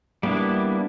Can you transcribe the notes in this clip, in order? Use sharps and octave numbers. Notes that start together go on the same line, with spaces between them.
G3 A#3 B3 D4 E4